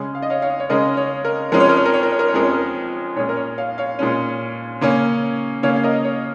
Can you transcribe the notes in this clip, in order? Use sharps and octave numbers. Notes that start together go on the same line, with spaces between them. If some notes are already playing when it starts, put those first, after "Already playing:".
Already playing: C#3 G#3 C#4
F5
D#5
C#5 F5
C#5 F5
C#5
C#3 G#3 C#4 A#4 D#5
C#5
A#4
F2 F3 G#3 C#4 A#4
C#5
A#4
C#5
A#4
C#5
A#4
C#5
A#4
C#5
F2 F3 G#3 C#4 A#4
C#5
A#4
A#2 G#3 C#4 C#5
A#4
C#5
C#5 F5
C#5 F5
A#2 G#3 C#4
C#3 A#3 C#4
C#3 A#3 C#4 C#5 F5
F5
A#4 D#5
C#5